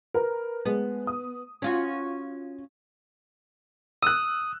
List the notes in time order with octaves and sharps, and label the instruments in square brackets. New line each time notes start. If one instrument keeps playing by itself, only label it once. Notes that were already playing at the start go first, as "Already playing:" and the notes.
[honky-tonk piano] A#4 B4
[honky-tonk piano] G#3 [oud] B3
[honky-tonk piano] D#6
[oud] C#4 F4 F#4
[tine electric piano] D#6 [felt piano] E6 F#6